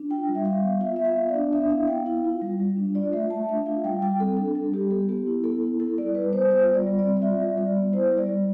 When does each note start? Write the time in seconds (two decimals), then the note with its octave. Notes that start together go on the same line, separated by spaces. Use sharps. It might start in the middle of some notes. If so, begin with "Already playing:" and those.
Already playing: D4
0.10 F4 G5
0.28 G3
0.35 E5
0.45 G3 F5
0.63 B3
0.81 F4 E5
0.96 B3 E5
1.05 F5
1.17 B3
1.29 D5
1.34 D4
1.53 B3 E5
1.70 E4 F5
1.88 B3 G5
2.06 E4 F5
2.24 F4
2.42 G3
2.60 G3
2.77 D4
2.95 F4 D5
3.13 A3 E5
3.30 A3 A5
3.49 D4 E5
3.66 F4 F5
3.84 G3 G5
4.02 G3 G5
4.20 C4 A4
4.37 D4 A4
4.55 G3 A4
4.72 G3 G4
4.91 B3 A4
5.09 B3 G4
5.27 E4
5.44 B3 A4
5.63 E4
5.79 E4 A4
5.98 G3 D5
6.15 G3 B4
6.33 B3 C5
6.51 F4 C5
6.69 G3
6.74 D5
6.87 G3
6.99 D5
7.04 C4
7.17 D5
7.22 F4 E5
7.40 G3
7.58 G3 D5
7.76 B3
7.93 E4 C5
8.12 G3
8.18 D5
8.29 G3